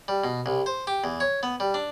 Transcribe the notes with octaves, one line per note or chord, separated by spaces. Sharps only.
G3
B2
C2
C5
G4
E2
C#5
B3
G3
D4